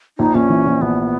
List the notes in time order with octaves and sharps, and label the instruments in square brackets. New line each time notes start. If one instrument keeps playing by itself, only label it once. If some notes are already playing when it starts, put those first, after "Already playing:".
[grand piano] A#1 [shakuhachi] D#4
[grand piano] A#1 [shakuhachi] C#4
[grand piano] E3
A#1
[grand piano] A#1 [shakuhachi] B3